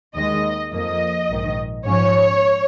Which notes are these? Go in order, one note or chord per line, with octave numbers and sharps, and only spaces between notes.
D#2 D#3 G#3 D#5
F2 F3 A#3 D#5
A#1 G#2 D#3
G#2 F3 C#4 C#5